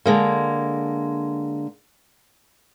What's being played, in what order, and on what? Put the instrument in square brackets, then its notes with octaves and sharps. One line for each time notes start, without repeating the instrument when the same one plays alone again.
[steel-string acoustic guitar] D3 G#3 A#3